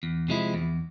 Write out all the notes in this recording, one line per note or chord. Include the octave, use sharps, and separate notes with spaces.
E2
C3 F3 G#3 E4
E2